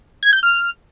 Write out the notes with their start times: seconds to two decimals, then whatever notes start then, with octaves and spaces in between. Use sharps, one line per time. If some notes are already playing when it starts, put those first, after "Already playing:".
0.23 G#6
0.33 G6
0.43 F6